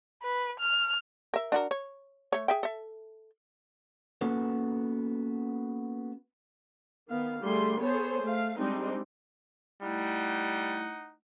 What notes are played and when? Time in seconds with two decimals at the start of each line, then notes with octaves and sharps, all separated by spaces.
0.23 B4
0.60 F6
1.34 A#4 E5
1.52 D4 F#4 A#4
1.71 C#5
2.33 A3 C#5
2.48 G#4 E5 G5
2.63 A4 E5
4.21 A#3 B3 C#4 F#4 A4 B4
7.09 D#3 B3 F5
7.41 D3 G3 A3 G#4 C6
7.79 B3 G#4 A4 C5 C#5
8.22 A3 F5
8.57 G3 G#3 C4 D4 D#4
9.82 G3 A3 D#4 E4 F#5